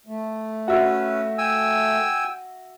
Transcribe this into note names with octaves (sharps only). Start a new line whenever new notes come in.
A3
C#4 F#4 B4 E5
G5 G#5 E6